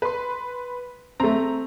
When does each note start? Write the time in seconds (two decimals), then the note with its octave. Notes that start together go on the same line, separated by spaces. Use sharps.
0.02 B4 C6
1.20 A3 C4 A#5